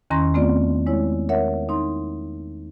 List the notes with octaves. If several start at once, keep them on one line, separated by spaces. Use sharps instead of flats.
E2 D#3 C#4 A#5 C6 A#6
A3 B3 C4 F4 D5
G#3 E4 C#5
A#4 C#5 E5 F#5
D#4 C6